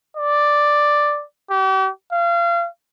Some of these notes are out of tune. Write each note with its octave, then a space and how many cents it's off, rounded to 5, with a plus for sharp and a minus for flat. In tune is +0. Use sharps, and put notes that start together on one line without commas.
D5 +5
G4 -40
F5 -30